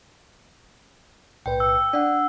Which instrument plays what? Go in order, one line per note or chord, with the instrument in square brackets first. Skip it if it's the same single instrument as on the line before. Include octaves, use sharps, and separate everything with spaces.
[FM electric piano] B1 A2 B4 [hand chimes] G5
[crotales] E6
[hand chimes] D4 F#5 [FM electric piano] D5